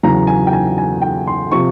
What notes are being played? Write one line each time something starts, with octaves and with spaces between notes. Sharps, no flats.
E2 C#3 F#3 A#5
G#5
G5
G#5
G#5
G5
C6
C3 F3 C#6